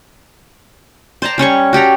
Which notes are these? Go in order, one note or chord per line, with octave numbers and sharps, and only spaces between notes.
C5 D5 A5 A#5
G3 C#4 C#5 C#6
F#4 G4 A4 A#5